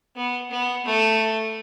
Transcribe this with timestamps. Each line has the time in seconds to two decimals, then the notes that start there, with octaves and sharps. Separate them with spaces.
0.16 B3
0.51 B3
0.85 A3